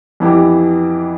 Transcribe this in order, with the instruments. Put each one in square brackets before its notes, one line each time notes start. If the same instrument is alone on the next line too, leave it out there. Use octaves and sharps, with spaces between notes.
[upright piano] F2 E3 B3 E4 G4